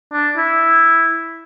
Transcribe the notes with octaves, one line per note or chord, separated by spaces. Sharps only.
D4
E4